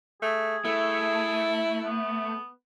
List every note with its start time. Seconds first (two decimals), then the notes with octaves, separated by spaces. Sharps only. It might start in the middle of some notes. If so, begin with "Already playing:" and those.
0.22 A3 G#4
0.65 A3 E4
1.83 B3